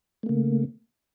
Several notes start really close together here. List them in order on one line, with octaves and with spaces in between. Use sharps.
A3 A#3 C#3